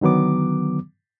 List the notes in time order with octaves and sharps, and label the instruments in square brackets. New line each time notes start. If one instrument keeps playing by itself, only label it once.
[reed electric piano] D3 D#3 F#3 B3 D6